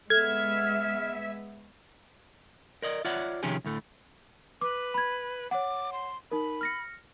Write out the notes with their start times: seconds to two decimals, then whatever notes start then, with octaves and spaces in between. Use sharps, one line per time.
0.10 G#3 B3 A4 E5 F6 G#6
2.82 A#4 D5 D#5
3.05 F4 C#5 D5 E5 F#5
3.43 C3 D#3 F3 C#4 G4 G#4
3.65 D2 A2 A3
4.61 B4 D6
4.94 B5 G#6
5.51 C#5 F#5 D6
5.92 C6
6.31 D#4 A#4 B5
6.61 F6 A#6 C#7